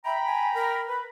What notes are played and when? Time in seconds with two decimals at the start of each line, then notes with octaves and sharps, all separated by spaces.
0.05 E5 G5 A#5 B5
0.26 G#5
0.54 A#4
0.89 B4 B5